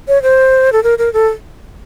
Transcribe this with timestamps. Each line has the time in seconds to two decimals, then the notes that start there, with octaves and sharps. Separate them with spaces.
0.08 C#5
0.23 C5
0.73 A4
0.84 A#4
0.98 A#4
1.13 A4